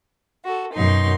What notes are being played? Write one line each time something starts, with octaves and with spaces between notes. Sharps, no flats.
F#4 A4
F#2 B2 D#4 C6